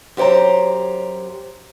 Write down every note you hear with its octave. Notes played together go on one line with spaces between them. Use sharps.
F#2 G4 C5 C#5 A#5